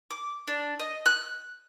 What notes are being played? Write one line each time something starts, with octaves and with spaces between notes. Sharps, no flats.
D6
D4
D#5
F#6